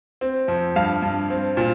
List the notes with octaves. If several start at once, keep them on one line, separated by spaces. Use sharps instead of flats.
C4
F2
G2 F5
G2
C4
A#2